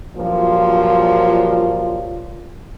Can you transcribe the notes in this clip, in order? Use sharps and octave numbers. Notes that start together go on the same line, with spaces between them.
G2 A#2 F3 F#3 F4